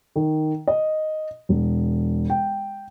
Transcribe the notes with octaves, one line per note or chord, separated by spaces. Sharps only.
D#3
D#5
E1
G5